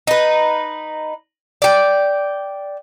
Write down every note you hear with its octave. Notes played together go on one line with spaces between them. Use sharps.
D#4 B4
D5 G5